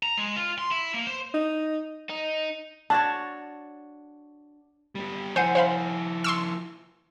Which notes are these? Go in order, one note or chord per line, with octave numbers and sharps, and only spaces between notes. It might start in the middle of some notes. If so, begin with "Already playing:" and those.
A#5
G#3
F4
C6
E4
A#3
C5
D#4
D#4
D4 F#4 C#5 A5
G3 B3
F3 E4 C5 F#5 G#5 G6
C5 F5 B5
C6 C#6 E6